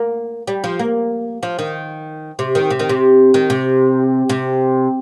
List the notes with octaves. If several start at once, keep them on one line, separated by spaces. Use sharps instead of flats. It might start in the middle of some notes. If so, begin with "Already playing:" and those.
Already playing: A#3
G3
F3
A#3
F3
D#3
C3
D#3
C3
D#3
C3
D#3
C3
C3